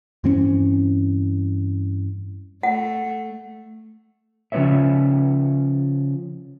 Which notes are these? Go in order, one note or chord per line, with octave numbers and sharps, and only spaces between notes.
G2 E3 C4 C#4
A3 F#5
C#3 F3 B3 B4 C#5 E5